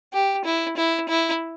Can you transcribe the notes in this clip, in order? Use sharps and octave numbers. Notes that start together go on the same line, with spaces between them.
G4
E4
E4
E4